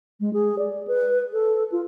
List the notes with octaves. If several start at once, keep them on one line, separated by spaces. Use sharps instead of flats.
G#3
G#4
D5
B4
A4
F4